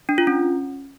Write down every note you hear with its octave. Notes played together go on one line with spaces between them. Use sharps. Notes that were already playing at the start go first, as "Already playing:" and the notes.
D4
F4
C#4